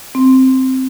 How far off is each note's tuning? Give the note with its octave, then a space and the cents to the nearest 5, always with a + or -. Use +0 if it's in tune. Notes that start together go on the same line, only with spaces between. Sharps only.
C4 +0